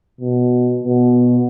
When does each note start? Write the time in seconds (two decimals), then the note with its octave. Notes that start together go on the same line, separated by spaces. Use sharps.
0.21 B2
0.84 B2